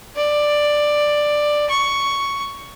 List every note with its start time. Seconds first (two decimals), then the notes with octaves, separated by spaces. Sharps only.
0.16 D5
1.70 C#6